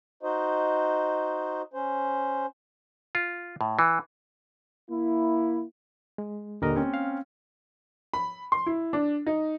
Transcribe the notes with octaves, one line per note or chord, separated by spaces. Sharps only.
D#4 F#4 C5 D#5
C#4 C5
F4
A2
E3
A#3 E4
G#3
D#1 D3 A#4 D#5
C4 C#4
F5
B5
C6
E4
D4
D#4